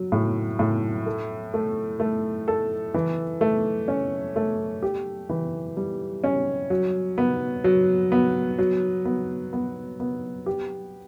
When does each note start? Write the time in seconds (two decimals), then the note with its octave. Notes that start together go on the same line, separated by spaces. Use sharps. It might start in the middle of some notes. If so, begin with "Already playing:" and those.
Already playing: F#3
0.12 A2
0.59 A2
1.06 A4
1.54 A3
2.00 A3
2.48 A4
2.94 E3
3.41 A3
3.88 C#4
4.36 A3
4.82 G4
5.29 E3
5.77 G3
6.24 C#4
6.70 F#3
7.18 B3
7.64 F#3
8.12 B3
8.59 F#3
9.05 B3
9.53 B3
10.00 B3
10.46 G4